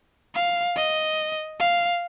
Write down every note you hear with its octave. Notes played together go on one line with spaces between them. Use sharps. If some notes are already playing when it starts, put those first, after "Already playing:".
F5
D#5
F5